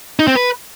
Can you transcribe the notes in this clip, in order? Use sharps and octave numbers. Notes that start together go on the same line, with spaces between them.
D#4
C4
B4